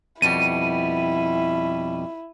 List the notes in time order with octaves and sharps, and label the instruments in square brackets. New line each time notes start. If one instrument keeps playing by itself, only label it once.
[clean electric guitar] F2 B2 G3 [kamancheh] E4 [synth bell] D#7